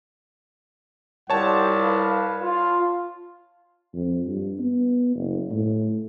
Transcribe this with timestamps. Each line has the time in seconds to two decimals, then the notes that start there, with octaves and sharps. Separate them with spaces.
1.30 C2 F4 G4 C#5 F#5 A5
1.79 B4 F5
2.42 F4
3.94 F2
4.26 G2
4.60 B3
5.15 F#1
5.51 A2